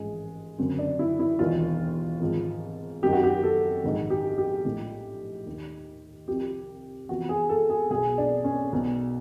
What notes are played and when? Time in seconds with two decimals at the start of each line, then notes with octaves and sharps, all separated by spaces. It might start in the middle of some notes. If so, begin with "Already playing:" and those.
Already playing: A1 G#2 F3 G#3
0.58 G1 F#2 C#3 C4
0.79 D4
0.99 E4
1.19 E4
1.39 E1 D#2 D#3 F4
2.20 G#1 G#2 F3
3.02 G#1 F#2 D#3 G4
3.13 F#4
3.24 G4
3.43 A4
3.84 A#1 G#2 D#3
4.10 G4
4.38 G4
4.65 A#1 A2 F3
5.46 D#2 D#3
6.28 C2 C3 F3 G4
7.09 E2 C3 F3 F#4
7.29 G#4
7.49 A4
7.70 G#4
7.90 B1 B2 G#4
8.18 D4
8.44 C#4
8.73 B1 B2